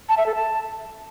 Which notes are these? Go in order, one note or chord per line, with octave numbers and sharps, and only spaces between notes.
A5
E5
A4
A5